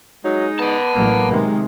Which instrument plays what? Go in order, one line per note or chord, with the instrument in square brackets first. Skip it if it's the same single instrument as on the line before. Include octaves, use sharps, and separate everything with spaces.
[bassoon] F#3 [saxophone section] G#3 D#4
[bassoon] B3 [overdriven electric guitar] F#5 A5
[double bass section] A1 F#3 [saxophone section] A#3
[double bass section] C3 D#3 G#3